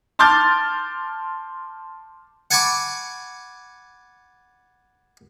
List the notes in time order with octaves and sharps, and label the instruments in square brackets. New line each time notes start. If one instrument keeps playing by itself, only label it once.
[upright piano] A5 C6 D6 F6 G6 A6
[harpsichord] F#5 G#5 A5 B5 C#6 D6